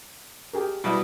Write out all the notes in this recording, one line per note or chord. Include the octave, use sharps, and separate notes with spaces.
G4 G#4 A#4
B2 G3 E4